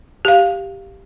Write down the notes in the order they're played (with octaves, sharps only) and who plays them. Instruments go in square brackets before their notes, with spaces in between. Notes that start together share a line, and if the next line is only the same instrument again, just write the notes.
[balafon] G4 F5